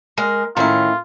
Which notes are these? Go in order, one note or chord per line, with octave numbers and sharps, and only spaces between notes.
G#3 A#4
A2 D#3 C#4 E4 F4 A#5